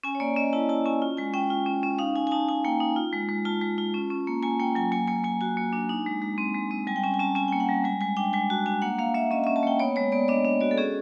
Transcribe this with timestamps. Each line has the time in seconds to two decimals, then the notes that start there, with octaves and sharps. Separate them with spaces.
0.04 C#4 G#5
0.15 C#5
0.20 A#3 D5
0.36 C#4 D#5
0.53 E4 A5
0.69 E4 A5
0.86 C#4 G#5
1.02 F4
1.17 G#3 G#5
1.34 C#4 G5
1.50 F4
1.66 C#4
1.83 C#4
1.99 D#4 F5
2.16 D#4 G#5
2.27 G#5
2.31 D#4 A5
2.48 D#4 G#5
2.64 A#3 G5
2.80 D#4
2.96 F4
3.13 G#3
3.29 G#3
3.45 F4 A5
3.61 G#3
3.78 F4
3.94 C#4
4.11 C#4
4.27 A#3
4.43 A#3 G#5
4.60 A#3 G5
4.75 F#3 G#5
4.92 A#3 G#5
5.08 A#3 G#5
5.24 A#3 G#5
5.41 F#4 G#5
5.57 A#3
5.73 D4
5.89 D#4
6.06 G#3
6.22 G#3
6.38 C4
6.55 G#3
6.71 C4
6.87 G3 G#5
6.96 G5
7.03 C#4 G#5
7.14 G#5
7.19 C#4 A5
7.35 C#4 G#5
7.48 A#3 G5
7.60 F#5
7.69 G3
7.84 G#3 G#5
8.01 G#3 G#5
8.17 D4 G5
8.33 G#3 G#5
8.50 F#4 A5
8.66 D4 G#5
8.82 A#3 F#5
8.98 A#3 F5
9.14 A#3 E5
9.31 C#4 D#5
9.44 C#4 E5
9.56 A5
9.63 A#3 G5
9.80 B3 C#5
9.96 G#3 C#5
10.12 B3 D5
10.28 D4 D#5
10.45 D4
10.61 F#4 D5
10.71 A4
10.78 C#4 G#4